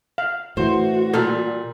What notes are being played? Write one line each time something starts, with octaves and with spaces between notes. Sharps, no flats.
F5
A2 E3 F#4 C5
A#2 G3 A4